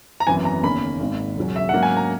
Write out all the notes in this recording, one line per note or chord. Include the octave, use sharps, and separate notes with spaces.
A#5
G#1 F#2 E3 B3 G#5
A#5
F#1 E2 D#3 A#3 C#4 B5
G#1 G#2 D#3
E1 E2 C#3 F#3 C#4
E5
G#2 F#3 A#3 C#4 F#5
G#5
A#5